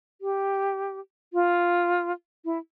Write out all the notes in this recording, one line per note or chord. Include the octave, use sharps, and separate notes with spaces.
G4
F4
E4